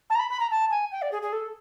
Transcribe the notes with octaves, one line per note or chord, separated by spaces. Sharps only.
A5
A#5
B5
B5
A#5
A5
G#5
G5
D5
G#4
G#4
A4